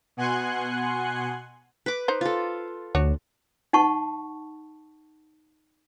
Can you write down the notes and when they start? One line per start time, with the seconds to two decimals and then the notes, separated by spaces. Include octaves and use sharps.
0.17 B2 F#5 G#5 C6 F#6 G#6
1.86 B4 D6
2.08 D#4 C5
2.21 F4 A4
2.95 D2 D4 F#4 C#5
3.73 D#4 F#5 A5 C#6